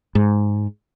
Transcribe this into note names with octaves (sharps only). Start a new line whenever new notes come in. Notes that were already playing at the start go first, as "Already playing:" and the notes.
G#2